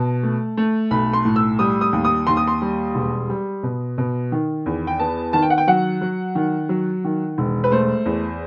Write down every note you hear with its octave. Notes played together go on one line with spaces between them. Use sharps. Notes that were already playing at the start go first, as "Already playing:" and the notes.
Already playing: B2 A5
A3
A3
B1 B5
C6
A2
E6
G3 D#6
D#6
D#2
D#6
D#2 C6
D#6
C6
G3
E1
G3
B2
B2
D#3
E2
G5
B3 A5
D#3 A5
G5
F#5
G5
F#3 F#5
F#3
D#3
F#3
D#3
E1
B4
A3 C5
E2